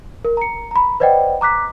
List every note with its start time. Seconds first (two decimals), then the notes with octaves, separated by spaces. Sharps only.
0.25 A#4
0.37 A#5 C#7
0.71 A#5 B5
1.00 B4 C5 D5 D#5 F#5 G5
1.41 A#5 D6 F#6 B6